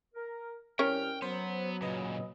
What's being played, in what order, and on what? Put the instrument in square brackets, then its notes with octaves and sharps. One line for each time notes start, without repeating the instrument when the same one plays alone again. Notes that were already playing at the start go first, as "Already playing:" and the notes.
[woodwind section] A#4
[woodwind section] C2 F6 [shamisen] C#4 A#4 C#5 [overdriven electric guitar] G5
[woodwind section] F#3 [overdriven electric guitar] B3 [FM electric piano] C5
[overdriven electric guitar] A#2 C#3 [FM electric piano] B4 D#5